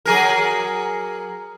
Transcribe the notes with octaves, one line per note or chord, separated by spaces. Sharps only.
F#3 G#4 A#4